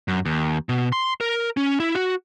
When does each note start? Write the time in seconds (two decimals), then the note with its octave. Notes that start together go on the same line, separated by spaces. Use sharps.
0.08 F#2
0.26 D#2
0.69 B2
0.92 C6
1.21 A#4
1.57 C#4
1.80 E4
1.95 F#4